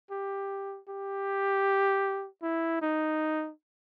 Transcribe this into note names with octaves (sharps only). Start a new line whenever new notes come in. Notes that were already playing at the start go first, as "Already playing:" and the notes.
G4
G4
E4
D#4